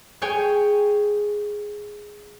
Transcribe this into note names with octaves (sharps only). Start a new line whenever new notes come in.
G#4 C#5 G5 G#5